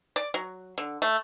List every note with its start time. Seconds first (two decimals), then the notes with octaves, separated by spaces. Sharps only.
0.16 D5
0.34 F#3
0.78 D3
1.02 A3